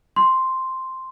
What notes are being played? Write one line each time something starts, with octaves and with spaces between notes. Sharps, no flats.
C6